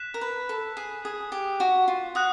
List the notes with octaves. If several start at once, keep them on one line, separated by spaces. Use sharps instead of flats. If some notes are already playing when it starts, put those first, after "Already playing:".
Already playing: F#6 B6 E7
A#4
B4
A4
G#4
G#4
G4
F#4
F4
F#4 D#6 F#6